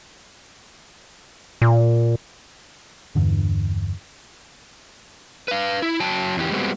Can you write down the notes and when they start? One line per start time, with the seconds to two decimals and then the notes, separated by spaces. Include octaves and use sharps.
1.62 A#2
3.15 E2 G2 D3 E3
5.48 B4 F5
5.82 E4
6.00 F#3 G5 A5
6.37 E2 E3 G4
6.51 G3 G#3 B3 C4 F#4